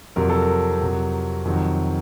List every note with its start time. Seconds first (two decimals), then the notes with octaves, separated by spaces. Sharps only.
0.16 F2 C3 F#3 A#4
0.30 A4
0.42 A#4
0.81 F2 C3 F#3
1.45 F2 C3 D#3 F#3